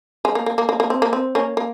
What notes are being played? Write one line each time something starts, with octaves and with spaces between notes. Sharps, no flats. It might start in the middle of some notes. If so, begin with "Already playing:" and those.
G#3
A#3
A#3
A#3
A#3
A#3
C4
A#3
C4
A#3 C#4
A#3